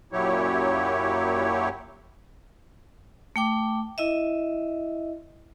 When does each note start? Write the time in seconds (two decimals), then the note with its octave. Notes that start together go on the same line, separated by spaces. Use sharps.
0.12 F#2 A#2 F#3 E4 G4 C#5
3.36 A3 G5 D6
3.98 E4 D#5 E5